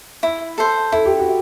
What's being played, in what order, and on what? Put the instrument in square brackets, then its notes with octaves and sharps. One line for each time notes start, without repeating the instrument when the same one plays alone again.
[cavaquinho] E4
A4 C5
[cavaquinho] E4 [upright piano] A4
[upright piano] G4
F#4